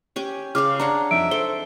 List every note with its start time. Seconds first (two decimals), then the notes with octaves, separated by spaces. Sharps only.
0.16 C#4 G4 G#5
0.55 C#3 G#4 F5 D6 F6
0.80 D4 C#5 F#5 A#5
1.11 F2 D#4 E5 D7
1.31 A4 C5 G7